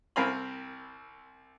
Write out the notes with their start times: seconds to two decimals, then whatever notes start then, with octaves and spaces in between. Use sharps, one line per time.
0.16 C2 C4 A#4 F5 G#5 B5